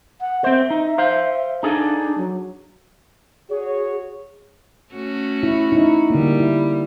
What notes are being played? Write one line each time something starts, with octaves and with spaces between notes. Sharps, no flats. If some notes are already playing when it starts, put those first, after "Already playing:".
F#5
C4 C5 E5
D#4
C5 F5
D4 D#4 G#4 A4
F#3
F#4 G#4 C#5
A3 C#4 F#4
E4
D#4 E4
D3 G3 A#3
E4